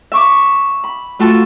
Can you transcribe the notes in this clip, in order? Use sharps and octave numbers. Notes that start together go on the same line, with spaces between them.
E5 C#6 D6
B5
A3 F4 F#4 A4 A5